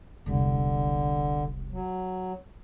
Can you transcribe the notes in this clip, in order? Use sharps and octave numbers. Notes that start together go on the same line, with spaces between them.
E1 C2 D3
F#3